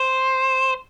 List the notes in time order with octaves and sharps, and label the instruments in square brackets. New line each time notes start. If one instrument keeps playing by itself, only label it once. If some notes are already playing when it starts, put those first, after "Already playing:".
Already playing: [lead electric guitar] C5